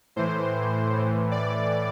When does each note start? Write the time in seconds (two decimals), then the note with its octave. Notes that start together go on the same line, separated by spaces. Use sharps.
0.16 A2 E3 C5
0.93 A2 E3
1.31 D5